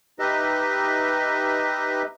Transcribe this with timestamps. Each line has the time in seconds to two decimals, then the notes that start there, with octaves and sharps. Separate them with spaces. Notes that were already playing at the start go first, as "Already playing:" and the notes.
0.19 D#4 G4 B4 D#5 E5